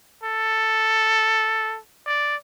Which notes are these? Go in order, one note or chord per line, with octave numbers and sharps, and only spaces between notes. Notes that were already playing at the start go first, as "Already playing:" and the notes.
A4
D5